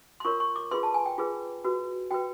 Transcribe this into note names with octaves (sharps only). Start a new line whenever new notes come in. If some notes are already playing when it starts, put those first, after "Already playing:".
C6
F4 A#4 C#5 C#6
C#6
D6
F4 G#4 B4 C6
A5
G#5
G5
F4 G#4 B4
F#4 B4
F#4 B4 G5